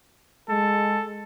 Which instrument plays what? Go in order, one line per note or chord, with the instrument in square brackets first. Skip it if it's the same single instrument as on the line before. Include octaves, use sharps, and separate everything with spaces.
[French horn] G#3 [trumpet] A4